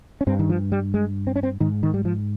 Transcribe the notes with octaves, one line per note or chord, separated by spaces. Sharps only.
C#4
G2 C4
D#3
F3
G3
G#3
C4
C#4
C4
G#2 D#3
D#3
G3
F3